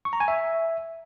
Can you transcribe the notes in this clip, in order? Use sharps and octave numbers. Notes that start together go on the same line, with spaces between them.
C#6
A#5
G#5
E5